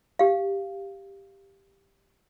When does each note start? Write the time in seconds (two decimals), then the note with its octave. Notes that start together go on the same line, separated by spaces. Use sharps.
0.19 G4 F5